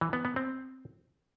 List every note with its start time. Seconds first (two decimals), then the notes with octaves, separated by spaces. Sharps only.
0.01 E3
0.13 B3
0.25 B3
0.36 C4